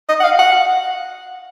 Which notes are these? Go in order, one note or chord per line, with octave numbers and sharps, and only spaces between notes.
D#5
F#5
F5
F#5